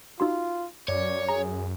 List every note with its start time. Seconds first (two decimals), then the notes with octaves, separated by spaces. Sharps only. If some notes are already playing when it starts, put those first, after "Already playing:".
0.20 D#4 F4 F#4 C6
0.88 F#2 C#5 D5
1.29 G#4 A#5